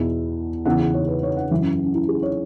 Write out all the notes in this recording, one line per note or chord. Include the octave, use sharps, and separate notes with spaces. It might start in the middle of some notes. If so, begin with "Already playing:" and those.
Already playing: E2 B2 E4
E2 C#3 E3 F#5
F#5
C#5
B4
C#5
F#5
F#2 E3 E5
C#4
C#4
E4
G#4
C#5